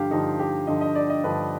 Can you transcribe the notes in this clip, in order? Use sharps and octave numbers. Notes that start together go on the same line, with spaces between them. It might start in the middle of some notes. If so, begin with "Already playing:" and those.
Already playing: G2 D3 F3 G4 F5
G2 D3 F3 D#4
G4
G2 D3 F3 D#5
D#5
D5
D#5
G2 D3 F3 B4